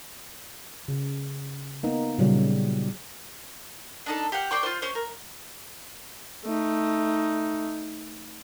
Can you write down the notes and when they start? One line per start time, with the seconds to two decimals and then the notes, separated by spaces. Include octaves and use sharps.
0.88 C#3
1.83 A#3 B3 D#4
2.19 A#2 C#3 F#3 G3
4.06 D4 D#4 A4
4.32 G4 F5 F#5
4.51 C5 D5 G5 C#6
4.63 F4 C5
4.82 C#4 C5
4.95 A#4
6.45 A3 D#4